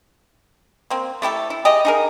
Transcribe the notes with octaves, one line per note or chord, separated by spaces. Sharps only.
A#3 C4
A3 E4 G4 A4
E4
G4 G#4 D#5
D#4 G#4 A#4